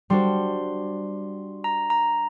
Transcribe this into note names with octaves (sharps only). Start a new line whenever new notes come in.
G3 D4 F#4 C5 C6
A#5
A#5